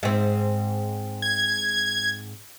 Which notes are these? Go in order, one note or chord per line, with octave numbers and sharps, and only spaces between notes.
G#2 C4
G#6